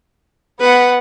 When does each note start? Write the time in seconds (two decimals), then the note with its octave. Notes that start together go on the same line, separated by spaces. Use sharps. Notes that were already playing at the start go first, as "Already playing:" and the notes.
0.60 B3 B4 F#5